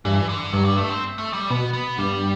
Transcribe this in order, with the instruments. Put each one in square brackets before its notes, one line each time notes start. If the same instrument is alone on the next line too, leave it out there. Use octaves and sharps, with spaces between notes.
[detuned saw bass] G2 [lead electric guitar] E3
[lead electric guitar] D3
[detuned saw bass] G2 [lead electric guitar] F#3
[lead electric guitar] G3
A3
C4
A3
G3
[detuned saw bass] B2 [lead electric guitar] B3
[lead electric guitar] B3
[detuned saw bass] G2 [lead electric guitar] G3